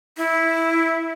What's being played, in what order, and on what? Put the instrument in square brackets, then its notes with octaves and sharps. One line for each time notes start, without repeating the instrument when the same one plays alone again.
[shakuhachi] E4